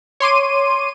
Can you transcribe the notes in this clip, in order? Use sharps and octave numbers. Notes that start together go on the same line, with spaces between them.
C#5 C6 D6 D#7